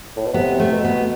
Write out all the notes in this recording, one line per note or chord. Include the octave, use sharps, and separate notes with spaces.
A2
B2
C3 B3
A3
B2
B3